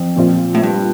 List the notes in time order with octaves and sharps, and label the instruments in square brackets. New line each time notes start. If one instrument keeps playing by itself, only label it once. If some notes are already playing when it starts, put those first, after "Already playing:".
Already playing: [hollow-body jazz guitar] F2
[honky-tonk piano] A#2 F3 C4 F4
[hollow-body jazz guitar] A2
G2